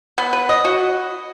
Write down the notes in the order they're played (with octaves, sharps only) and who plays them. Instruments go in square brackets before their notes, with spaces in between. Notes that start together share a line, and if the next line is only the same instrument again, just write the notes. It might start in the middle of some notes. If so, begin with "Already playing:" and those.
[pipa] B3
B4
D#5
F#4